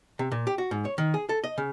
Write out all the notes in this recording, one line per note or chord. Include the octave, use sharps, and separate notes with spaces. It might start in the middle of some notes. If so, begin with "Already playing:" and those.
C3
A#2
G4
F#4
G#2
C#5
D#3
G#4
A4
D#5
C#3